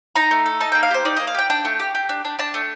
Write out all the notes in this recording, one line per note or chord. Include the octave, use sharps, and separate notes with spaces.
D#4 A#5
A3
A4
D#4 A5
A#3 G5
F5
G4 C5
D#4 D5
A#3 D#5
F5
G4 G5
D4 G5
A3
G4
G4
D4
D4
D4 A5
A3